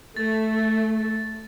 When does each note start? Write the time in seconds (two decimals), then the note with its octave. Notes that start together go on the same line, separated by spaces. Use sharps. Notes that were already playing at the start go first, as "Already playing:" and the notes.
0.17 A3 A6